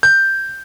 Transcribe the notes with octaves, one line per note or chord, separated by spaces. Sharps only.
G6